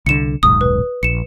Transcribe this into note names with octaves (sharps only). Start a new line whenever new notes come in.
C2 D3 C#7 E7
D#1 B1 G#2 D#6
B4
A#1 C#7 E7